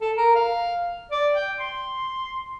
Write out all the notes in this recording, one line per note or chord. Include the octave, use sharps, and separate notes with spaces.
A4
A#4
F5
D5
G5
C6